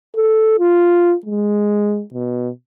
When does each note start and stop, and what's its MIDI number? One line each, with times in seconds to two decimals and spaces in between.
0.16 0.55 69
0.59 1.15 65
1.25 2.03 56
2.14 2.49 47